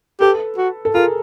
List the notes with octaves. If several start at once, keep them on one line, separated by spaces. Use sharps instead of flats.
G4 A4 B4
F#4
A4
F4 G#4 A#4